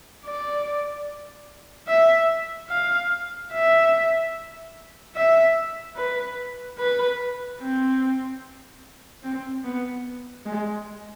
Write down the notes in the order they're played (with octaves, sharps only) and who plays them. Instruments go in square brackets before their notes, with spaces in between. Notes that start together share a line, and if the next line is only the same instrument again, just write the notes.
[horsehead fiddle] D5
E5
F5
E5
E5
B4
B4
C4
C4
B3
G#3